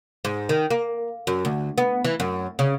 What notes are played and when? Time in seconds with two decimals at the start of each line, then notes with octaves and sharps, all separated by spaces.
0.25 G#2
0.49 D#3
0.71 A#3
1.27 F#2
1.45 D2
1.78 B3
2.04 E3
2.20 F#2
2.59 C#3